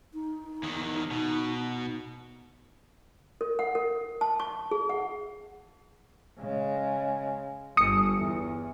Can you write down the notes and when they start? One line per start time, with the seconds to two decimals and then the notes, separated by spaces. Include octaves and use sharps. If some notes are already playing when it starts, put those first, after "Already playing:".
0.14 D#4
0.63 E2 D#3
1.11 B2
3.41 A#4
3.59 F#5
3.75 A#4
4.21 A5
4.40 C#6
4.71 G#4
4.89 F#5
6.39 C#3 G#3
7.77 G1 D#6 C#7
8.21 E2